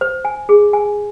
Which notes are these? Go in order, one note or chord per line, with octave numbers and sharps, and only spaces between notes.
C5
G#5
G#4
G#5